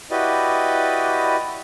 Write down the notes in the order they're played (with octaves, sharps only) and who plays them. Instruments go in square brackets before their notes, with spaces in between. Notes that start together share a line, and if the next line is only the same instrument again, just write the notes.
[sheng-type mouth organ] E4 F#4 G4 B4 D5 D#5